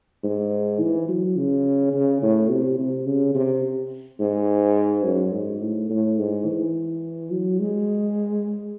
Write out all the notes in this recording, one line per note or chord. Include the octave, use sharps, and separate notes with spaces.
G#2
E3
F#3
C#3
C#3
A2
C3
C3
C#3
C3
G#2
F#2
G#2
A2
A2
G#2
E3
F#3
G#3